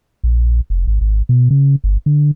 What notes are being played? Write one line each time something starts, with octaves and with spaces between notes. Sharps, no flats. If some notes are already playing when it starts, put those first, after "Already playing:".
A#1
F1
G#1
G#1
B2
C#3
G1
D3